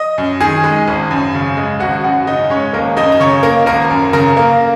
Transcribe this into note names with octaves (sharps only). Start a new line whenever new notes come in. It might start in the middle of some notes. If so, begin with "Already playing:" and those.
Already playing: D#5 D#6
F#2
D#3 G#4 G#5
G#3
G#1
F#2
C#3
G#3
G#1 F#4 F#5
F#2 F#4 F#5
C#3 D#4 D#5
G#3 C#4 C#5
G#1 A#3 A#4
F#2 D#4 D#5
A#5
C#3 C#5 C#6
A#3 A#4 A#5
G#1 A#4 A#5
F#2
C#3 A#4 A#5
A#3